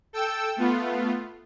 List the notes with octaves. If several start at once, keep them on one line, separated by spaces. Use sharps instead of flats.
A4 G5 E6
A3 B3 F4